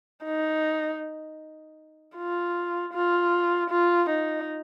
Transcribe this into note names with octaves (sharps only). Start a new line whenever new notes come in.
D#4
F4
F4
F4
D#4